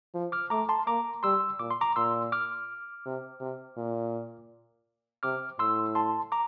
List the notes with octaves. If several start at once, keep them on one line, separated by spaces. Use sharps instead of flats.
F3
D6 F6
A3 A#5 D6
A5 C6
A#3 A#5 D6
G3 C6 E6
A#2 D6
C6
A#5 D6
A#2 C6 E6
D6 F6
C3
C3
A#2
C3 D6 F6
A2 C6 E6
A5 C6
A#5 D6